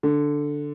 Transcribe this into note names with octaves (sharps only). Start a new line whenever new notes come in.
D3